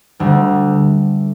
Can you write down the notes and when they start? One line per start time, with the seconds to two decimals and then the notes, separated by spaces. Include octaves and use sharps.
0.20 D2 D3 G3